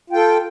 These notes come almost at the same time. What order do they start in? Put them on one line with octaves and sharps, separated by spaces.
F4 G5 A4